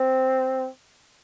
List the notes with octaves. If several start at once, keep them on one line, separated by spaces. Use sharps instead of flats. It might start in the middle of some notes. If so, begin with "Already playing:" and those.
Already playing: C4